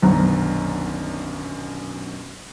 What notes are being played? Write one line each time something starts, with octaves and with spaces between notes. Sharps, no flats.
D#1 B1 F#2 D3 B3 A#5